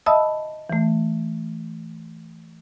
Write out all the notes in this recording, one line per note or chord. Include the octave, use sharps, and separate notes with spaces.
D#5 E5 A5 B5 D#6 E6
E3 A3